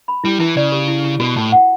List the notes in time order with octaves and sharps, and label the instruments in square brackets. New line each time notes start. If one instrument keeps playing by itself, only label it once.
[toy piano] B5
[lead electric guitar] G3 [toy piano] E4
[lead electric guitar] E3 [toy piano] E4
[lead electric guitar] C#3 [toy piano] D5
[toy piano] G4
E4
E4
[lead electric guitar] B2 [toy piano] F#4
[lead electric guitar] A2 [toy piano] A5
[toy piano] F#5